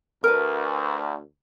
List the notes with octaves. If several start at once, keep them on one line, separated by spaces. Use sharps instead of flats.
D2 A#4 B4